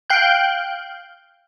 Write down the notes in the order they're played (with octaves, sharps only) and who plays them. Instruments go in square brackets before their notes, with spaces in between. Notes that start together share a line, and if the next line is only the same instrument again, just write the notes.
[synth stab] F5 G5 F#6 G6